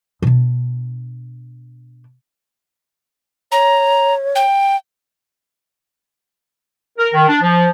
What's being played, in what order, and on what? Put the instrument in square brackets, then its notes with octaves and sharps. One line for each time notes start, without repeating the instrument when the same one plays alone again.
[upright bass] B2 D4
[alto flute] C#5 [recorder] A#5
[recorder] G5
[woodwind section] A#4
D#3
D4
F3